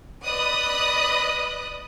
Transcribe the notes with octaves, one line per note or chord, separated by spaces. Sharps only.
B4 D5 D#5 B5 D#6 F#6